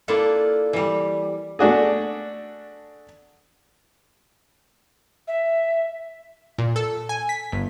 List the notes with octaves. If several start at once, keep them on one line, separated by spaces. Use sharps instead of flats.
A#3 D4 E4 F4 A4
E3 G3
A3 D4 F#4 G#4
E5
A#2
A4
G#5
B6
G1